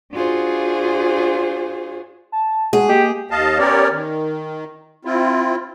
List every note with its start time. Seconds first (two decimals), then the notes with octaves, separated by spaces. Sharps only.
0.13 D4 F4 F#4 G#4 C5
2.32 A5
2.73 G#3 F#4 G#4
2.89 G#3 A#3 G4
3.31 D#2 D#5 F5 A5
3.58 B3 C#4 G4 A#4 C#5 D5
3.92 D#3
5.05 C4 E4 F4